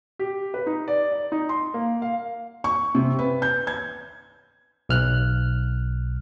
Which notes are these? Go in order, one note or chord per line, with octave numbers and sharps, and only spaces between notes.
G4
B4
D#4
D5
D5
D#4
C6
A#3
F5
C#6
C3
B4
G6
G#6
B1 F6 F#6